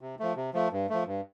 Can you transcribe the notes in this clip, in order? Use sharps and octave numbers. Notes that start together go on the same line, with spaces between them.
C3
F3 A3
C3
F3 A3
G2
F3 A3
G2